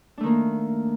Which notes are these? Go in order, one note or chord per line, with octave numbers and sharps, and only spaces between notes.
D#3 A3 A#3 D4